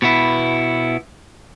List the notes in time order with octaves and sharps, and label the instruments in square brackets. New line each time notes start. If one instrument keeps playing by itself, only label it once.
[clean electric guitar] B2 B3 E4